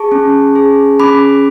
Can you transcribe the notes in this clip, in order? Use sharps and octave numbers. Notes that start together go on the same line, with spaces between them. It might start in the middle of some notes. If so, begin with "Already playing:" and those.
Already playing: G#4 A5 C#6
C#4
G#4
C#4 B5 D6